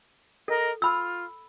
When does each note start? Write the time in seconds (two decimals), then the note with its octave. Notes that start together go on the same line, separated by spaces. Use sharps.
0.48 A4 A#4 D#5
0.82 F4 B5 E6